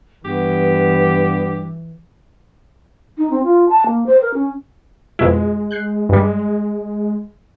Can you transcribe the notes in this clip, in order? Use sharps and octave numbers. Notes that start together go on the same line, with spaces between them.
G2 E3 B3 G4
D#4
C4
F4
A5
A#3
C5
A#4
C#4
F2 B2 G#3 E4
F#6 G6 C7
G2 G3 G#3